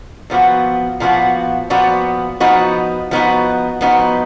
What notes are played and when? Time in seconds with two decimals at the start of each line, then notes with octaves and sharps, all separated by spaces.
0.30 A#2 F3 B3 F#4
1.00 A#2 F3 B3 F#4
1.70 A#2 F3 B3 F#4
2.40 F3 B3 D#4 F#4
3.11 F3 B3 D#4 F#4
3.81 F3 B3 D#4 F#4